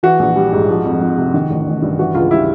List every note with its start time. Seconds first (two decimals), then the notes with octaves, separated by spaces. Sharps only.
0.03 E3 F#4
0.19 A#1
0.36 G3
0.52 G#2
0.69 F3
0.85 F2
1.01 F2
1.18 C3
1.34 D#3
1.50 A1
1.66 A1
1.82 G2
1.99 E3 F#4
2.15 C#2 F4
2.31 G3 E4